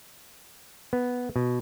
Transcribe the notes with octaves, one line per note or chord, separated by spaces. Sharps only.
B3
B2